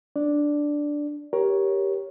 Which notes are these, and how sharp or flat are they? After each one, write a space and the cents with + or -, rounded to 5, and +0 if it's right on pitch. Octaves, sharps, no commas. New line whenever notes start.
D4 +0 D5 +0
G4 +0 A#4 +20 C#5 +0